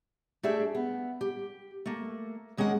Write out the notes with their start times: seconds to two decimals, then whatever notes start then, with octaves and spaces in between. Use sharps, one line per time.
0.43 A3 D4 G4 G#4 E5
0.75 B3
1.21 G4
1.86 A3 A#3
2.57 D#2 G#3 C#4 A#4 F#5